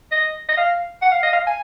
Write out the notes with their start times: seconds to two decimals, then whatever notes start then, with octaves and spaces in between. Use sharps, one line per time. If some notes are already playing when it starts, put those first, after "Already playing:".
0.12 D#5
0.49 D#5
0.57 F5
1.02 F#5
1.12 F5
1.23 D#5
1.33 F5
1.47 G#5